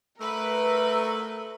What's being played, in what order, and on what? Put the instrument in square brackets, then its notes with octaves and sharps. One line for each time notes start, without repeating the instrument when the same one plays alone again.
[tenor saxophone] A3 [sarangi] A#4 [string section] B4 [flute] E6